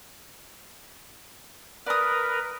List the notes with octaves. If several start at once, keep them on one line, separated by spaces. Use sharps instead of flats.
A#4 B4 D5 D#6